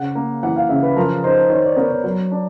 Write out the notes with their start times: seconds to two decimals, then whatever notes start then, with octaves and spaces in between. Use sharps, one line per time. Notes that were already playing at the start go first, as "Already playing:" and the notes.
Already playing: C#3 F#5
0.15 A#3
0.43 E3 F#5
0.56 F5
0.69 C#3 E5
0.83 B4
0.96 F3 A#4
1.24 D#4 C5
1.50 D#3 C#5
1.64 D5
1.77 B3 A#4
1.90 C#5
2.04 F#3 C#5
2.32 D4